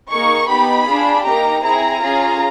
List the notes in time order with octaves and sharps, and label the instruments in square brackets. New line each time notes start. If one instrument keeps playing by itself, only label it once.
[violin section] A#3 D#4 G#4 C#6
B3 D#4 G4 B5
D4 F4 G#4
A#3 D#4 G4 A#5
C4 E4 G#4 A#5
C#4 F4 G#4